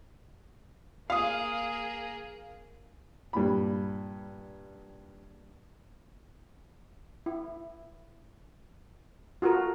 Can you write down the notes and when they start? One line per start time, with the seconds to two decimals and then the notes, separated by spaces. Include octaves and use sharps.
1.10 A#3 G#4 F5 D#6
3.33 G2 A#2 B5
7.26 E4
9.42 F4 F#4 A4 A#4